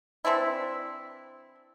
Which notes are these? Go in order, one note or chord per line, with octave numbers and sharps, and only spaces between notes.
E3 C4 D4 E4